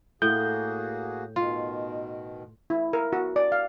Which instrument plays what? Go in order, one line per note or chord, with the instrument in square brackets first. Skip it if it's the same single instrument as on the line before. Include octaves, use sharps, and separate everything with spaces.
[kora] A2 [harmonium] A#3 F#4 G#4 [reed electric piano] G6
[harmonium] B2 D#3 [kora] F4
[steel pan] E4
A#4
F#4
D5
F5